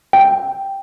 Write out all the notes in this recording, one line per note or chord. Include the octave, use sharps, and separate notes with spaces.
G5